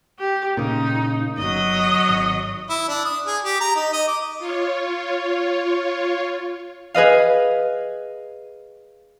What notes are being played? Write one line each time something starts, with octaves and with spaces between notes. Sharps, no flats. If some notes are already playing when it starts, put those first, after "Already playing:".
G4
A#2 C#3 D#4
G1 F#3 D#5
G#1
E4
D4
D#6
G#4
G4
A#5
D#4
D#5
D6
F4 C#5
G#4 B4 D#5 F5